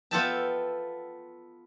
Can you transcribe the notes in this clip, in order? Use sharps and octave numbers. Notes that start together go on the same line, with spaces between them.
B3 F4 A4 E5 G5 A5